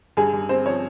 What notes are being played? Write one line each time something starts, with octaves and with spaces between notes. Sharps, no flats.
G2 G#4
G2
C4 C5
F3 C#5